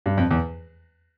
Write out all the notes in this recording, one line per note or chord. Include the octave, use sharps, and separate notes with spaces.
G2
F2
E2